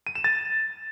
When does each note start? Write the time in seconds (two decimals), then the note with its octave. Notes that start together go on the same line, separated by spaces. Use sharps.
0.07 D#7
0.15 E7
0.24 A6